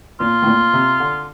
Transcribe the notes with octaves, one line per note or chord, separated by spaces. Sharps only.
A#2 F4
A2
A#2
C3
D3